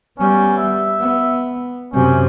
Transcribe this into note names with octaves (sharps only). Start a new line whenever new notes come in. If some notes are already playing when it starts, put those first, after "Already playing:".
G3 B3 C#4
E5
B3
F#2 C3 C#4